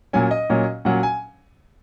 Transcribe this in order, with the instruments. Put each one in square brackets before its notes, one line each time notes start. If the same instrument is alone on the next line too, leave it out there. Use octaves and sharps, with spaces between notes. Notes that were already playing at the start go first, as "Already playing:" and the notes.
[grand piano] A#2 F#3 C#4 G#5
D#5
A#2 F#3 C#4
A#2 F#3 C#4 F#5
G#5